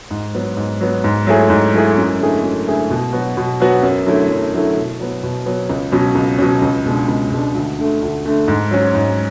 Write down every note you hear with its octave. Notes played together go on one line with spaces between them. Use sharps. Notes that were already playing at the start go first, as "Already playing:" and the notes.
G#2
F#3 B3
G#2
F#3 B3
G#2
F#3 A3 E4 G#4
G#2
F#3 A3 E4 G#4
F#2
D3 A3 E4 G#4
F#2
D3 A3 E4 G#4
B2
F#3 B3 F#4
B2
F#3 B3 F#4
F#2
D3 F#3 A3 E4
F#2
D3 F#3 A3 E4
B2
F#3 B3
B2
F#3 B3
C#2
B2 F#3 C#4
C#2
B2 F#3 C#4
C#2
B2 G#3 D4
C#2
B2 G#3 D4
D2
D3 A3
D2
D3 A3
G#2
F#3 C#4
G#2